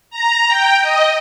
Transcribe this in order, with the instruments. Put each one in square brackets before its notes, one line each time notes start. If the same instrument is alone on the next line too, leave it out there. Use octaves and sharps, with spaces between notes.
[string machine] A#5
G5
D#5